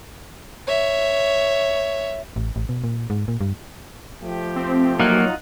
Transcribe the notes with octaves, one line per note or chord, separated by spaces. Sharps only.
C#5 E5
A1
A1
B2
A#2
G#2
A#2
G2
F3 A3 G4
C4
F#3 A#3 D#4 F4 F#5